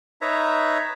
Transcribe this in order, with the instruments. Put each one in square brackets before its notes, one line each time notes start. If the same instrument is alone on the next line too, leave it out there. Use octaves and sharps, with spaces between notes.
[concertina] D#4 B4 C#5 E5 A#5